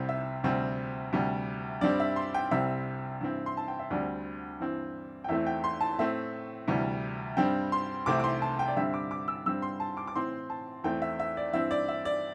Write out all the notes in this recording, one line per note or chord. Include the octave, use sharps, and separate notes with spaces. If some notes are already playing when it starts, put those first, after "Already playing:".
Already playing: C2 C3 G3 C4
E5
D2 C3 G3 C4
D2 C3 G3
G2 G3 C4 D5
E5
C6
G5
C2 C3 G3 C4 E5
G2 E3 C4
C6
A5
G5
E5
D2 D3 G3 C4 D5
G2 E3 C4
G5
E2 E3 A3 C4 E5
G5
C6
A5
A2 A3 C4 E5
D2 C3 E3 G3
G2 G3 C4 G5
C6
C2 C3 E3 A3 C4 D6
D6
C6
A5
G5
D5
G2 D3 G3 C4 E5
D6
D6
E6
G2 G3 C4 E6
C6
A5
D6
D6
A2 E3 C4 C6
A5
E2 E3 A3 C4 G5
E5
E5
D5
G2 E3 C4 E5
D5
E5
D5